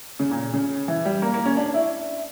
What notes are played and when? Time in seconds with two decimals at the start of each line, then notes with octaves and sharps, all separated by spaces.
0.20 C#3
0.31 A#2
0.54 C#3
0.88 E3
1.05 G3
1.22 A#3
1.34 A#3
1.46 C#4
1.57 D4
1.74 E4